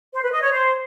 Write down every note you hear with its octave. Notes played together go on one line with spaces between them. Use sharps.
C5
B4
D#5
C#5
C5